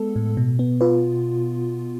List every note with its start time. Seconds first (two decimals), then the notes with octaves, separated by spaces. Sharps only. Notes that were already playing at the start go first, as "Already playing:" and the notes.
Already playing: G#3 B3 A4
0.16 A2
0.37 B2
0.59 B3
0.81 F4 B4